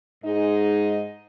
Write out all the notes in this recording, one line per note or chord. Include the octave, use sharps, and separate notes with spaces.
G#2 G#3 D#4 G#4 D#5